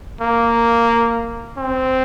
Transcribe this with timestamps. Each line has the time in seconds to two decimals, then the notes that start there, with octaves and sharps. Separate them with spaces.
0.21 A#3
1.57 C4